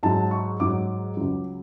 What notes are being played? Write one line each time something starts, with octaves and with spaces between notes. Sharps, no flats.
G#2 F#3 A5
C#6
G#2 F#3 D6
C#2 C#3 F#3